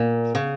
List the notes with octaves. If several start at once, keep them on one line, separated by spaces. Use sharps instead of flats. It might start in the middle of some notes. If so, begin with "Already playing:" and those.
Already playing: A#2
C#3